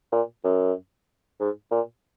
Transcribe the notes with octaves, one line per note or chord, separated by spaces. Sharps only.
A#2
F#2
G#2
A#2